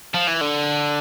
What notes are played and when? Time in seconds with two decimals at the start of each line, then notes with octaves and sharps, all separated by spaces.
0.15 F3
0.28 E3
0.41 D3